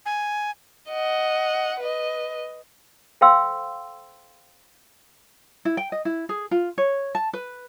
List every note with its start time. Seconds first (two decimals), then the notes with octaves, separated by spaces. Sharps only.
0.06 G#5
0.89 D#5 F#5
1.79 B4 D#5
3.21 A4 C5 F5 G5 C6 E6
5.65 E4
5.77 G5
5.92 D#5
6.05 E4
6.29 G#4
6.51 F4
6.78 C#5
7.15 A5
7.33 B4